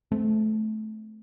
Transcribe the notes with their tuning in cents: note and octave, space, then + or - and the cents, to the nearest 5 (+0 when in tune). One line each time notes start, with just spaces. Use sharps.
A3 -20 C4 -15